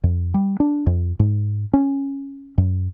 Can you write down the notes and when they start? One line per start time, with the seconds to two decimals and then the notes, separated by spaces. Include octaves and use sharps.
0.04 F2
0.34 G3
0.60 D4
0.86 F2
1.19 G#2
1.73 C#4
2.58 F#2